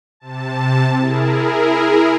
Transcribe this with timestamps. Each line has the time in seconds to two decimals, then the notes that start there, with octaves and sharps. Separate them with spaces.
0.20 C3 A5
0.96 E4 G#4 A#4